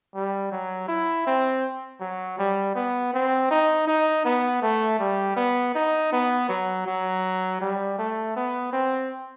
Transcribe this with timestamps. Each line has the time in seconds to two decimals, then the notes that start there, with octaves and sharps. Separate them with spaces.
0.15 G3
0.52 F#3
0.88 E4
1.27 C4
2.00 F#3
2.39 G3
2.75 B3
3.14 C4
3.51 D#4
3.87 D#4
4.25 B3
4.62 A3
4.99 G3
5.37 B3
5.75 D#4
6.12 B3
6.49 F#3
6.86 F#3
7.61 G3
7.99 A3
8.36 B3
8.73 C4